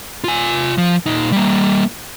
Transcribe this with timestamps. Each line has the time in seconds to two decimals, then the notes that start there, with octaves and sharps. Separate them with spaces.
0.24 F4 G#5
0.78 F3
1.06 A#2 D#4
1.32 G3 A#3